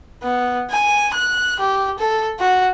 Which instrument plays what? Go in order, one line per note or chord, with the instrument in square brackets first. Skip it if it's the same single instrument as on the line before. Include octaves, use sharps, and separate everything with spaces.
[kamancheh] B3
G#5
F#6
G4
A4
F#4